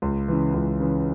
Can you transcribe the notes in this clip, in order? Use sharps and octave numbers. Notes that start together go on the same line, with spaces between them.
C#2
C#3 E3
C#2
C#3 E3